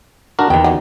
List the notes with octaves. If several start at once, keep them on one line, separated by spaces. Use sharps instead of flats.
D4 F#4 A#4
E2 D#3 G5
F#3 D#4